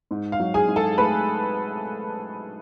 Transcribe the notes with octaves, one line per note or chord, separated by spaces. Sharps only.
G#2
F5
F#3
G#4 G#5
G#2
A4 A5
A3 B4 B5